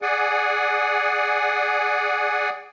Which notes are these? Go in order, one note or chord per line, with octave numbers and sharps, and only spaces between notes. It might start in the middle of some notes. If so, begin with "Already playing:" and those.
G#4 D5 F#5 G#5